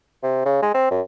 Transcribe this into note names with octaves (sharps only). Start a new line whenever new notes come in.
C3
C#3
G#3
C4
F#2